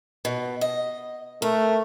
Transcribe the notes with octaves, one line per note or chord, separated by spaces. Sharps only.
B2
D#5
A3 A#4